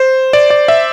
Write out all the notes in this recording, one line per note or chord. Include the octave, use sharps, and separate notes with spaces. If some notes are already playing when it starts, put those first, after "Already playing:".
Already playing: C5
D5
D5
E5